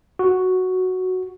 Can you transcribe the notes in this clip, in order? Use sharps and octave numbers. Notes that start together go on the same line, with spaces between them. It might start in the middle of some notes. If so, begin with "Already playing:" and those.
F#4